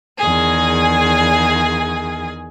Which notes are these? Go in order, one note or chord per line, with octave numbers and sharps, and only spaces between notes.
E2 D#3 G#4 G#5